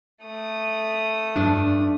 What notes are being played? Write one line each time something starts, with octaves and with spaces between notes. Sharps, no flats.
A3 D#6
G2 D4 D5